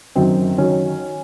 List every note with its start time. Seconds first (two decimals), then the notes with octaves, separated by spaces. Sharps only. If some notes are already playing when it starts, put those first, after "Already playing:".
0.15 F#2 D#3 F#3 C4
0.58 D#3 F#3 C#4